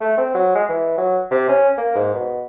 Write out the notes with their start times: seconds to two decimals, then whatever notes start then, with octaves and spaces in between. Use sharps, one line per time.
0.01 A3
0.17 C4
0.35 F#3
0.55 G#3
0.69 E3
0.98 F#3
1.31 C3
1.49 C#4
1.77 A#3
1.95 G#2
2.14 B2